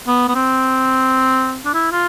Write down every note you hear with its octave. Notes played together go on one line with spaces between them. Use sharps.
B3
B3
C4
D4
E4
F4